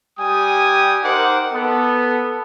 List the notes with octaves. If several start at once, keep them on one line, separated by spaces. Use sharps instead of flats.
G3 G4 G5 G#5 D#6
D#4 A#4 C5 F#5 D6
B3 A4